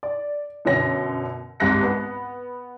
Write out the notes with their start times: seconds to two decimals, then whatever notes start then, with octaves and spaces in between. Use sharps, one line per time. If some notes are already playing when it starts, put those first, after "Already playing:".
0.03 D5
0.65 F#2 B2 D3 C#4 A#6
1.60 C2 G#2 C3 F#6 A#6 C#7
1.83 B3